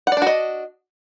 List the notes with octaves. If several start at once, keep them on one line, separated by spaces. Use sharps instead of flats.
D4 F#4 D5 D#5 F#5